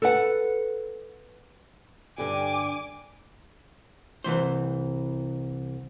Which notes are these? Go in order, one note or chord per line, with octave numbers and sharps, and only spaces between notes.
A4 B4 F#5
G2 D3 G4 G#5 D6
C2 E3 C5